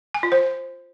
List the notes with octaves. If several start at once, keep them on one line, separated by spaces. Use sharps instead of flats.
G#5
F4
C5